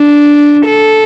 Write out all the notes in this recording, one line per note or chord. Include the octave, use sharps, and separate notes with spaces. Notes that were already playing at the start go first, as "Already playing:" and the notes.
Already playing: D4
A4